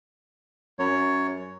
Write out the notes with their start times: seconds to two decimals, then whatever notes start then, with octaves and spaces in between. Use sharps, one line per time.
0.79 F#2 C#5